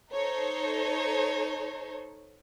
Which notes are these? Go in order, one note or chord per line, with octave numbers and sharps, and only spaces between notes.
D#4 A4 C5 C#5